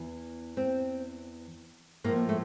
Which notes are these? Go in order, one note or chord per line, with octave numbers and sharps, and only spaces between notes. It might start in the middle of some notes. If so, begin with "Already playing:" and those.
Already playing: E2 E3
C4
A2 F3 A#3
A3